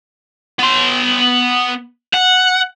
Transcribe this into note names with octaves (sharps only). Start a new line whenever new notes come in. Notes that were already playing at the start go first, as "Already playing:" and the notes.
B3 C6
F#5